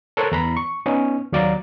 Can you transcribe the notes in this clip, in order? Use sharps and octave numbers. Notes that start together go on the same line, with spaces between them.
A4 A#4 C5 C#5 E6 F#6
E2 A#5 B5
C#6
B3 C#4 D#4
D#2 F#3 D5 F5 A#5